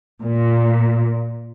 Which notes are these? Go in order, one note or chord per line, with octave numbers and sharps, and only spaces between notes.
A#2